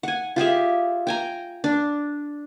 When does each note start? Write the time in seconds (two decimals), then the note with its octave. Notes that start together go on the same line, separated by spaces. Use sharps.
0.03 F#5 G#5
0.36 F4 G4 G#4 E5
1.07 G5 G#5 A#5
1.64 D4